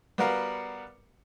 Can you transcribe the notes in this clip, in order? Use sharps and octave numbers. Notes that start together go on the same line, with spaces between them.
G3 B3 F#4 A#4 F5 F#5